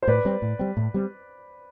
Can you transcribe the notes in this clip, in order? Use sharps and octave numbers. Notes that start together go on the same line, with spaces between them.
C5
A2 B4 D5
G3 C4
A2
G3 C4
A2
G3 C4